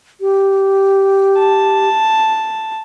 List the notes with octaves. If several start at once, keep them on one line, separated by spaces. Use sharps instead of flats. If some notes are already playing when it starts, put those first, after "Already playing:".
G4
A5